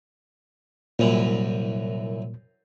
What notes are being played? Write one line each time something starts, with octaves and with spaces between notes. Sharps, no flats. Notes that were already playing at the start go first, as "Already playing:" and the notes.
C2 F#2 A#2 E3